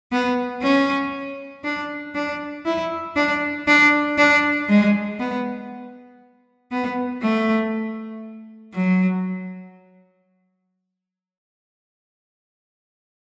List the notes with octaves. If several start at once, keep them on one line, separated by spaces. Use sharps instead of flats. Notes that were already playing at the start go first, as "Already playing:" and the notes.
B3
C#4
D4
D4
E4
D4
D4
D4
G#3
B3
B3
A3
F#3